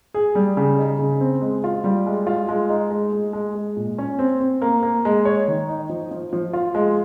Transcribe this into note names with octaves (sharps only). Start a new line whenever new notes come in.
G#4
G3
C#3
D#4
C#3
C4
G#3
F4
G3
G#3
F4
G#3
D#4
G#3
G#3
G#3
G#3
A#2
C#4
C4
C4
A#3
A#3
G#3
C#5
D#3
D#4
F3
F3
F3
F4
G#3